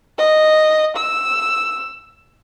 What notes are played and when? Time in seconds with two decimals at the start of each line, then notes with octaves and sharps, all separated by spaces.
0.18 D#5
0.97 E6